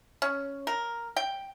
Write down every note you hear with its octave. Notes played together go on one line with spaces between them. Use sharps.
C#4
A#4
G5